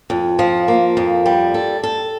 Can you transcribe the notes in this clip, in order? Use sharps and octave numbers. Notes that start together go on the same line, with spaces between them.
F2
F3
A#3
F2
G3
A4
A4